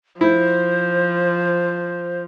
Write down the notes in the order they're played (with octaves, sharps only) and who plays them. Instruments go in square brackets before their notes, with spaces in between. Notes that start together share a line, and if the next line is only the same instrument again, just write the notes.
[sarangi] F3 [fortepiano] E4 [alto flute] C5